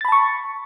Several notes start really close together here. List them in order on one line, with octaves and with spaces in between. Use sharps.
A6 B5 A5 C#6